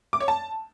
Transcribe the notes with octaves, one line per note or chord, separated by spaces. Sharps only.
D6
C#5
A5